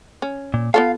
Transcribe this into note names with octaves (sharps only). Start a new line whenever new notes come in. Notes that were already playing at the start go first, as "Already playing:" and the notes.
C#4
A#2
B3 F4 A4 F5